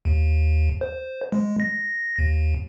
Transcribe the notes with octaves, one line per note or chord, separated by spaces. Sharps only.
D#2
C5
G#3
A#6
D#2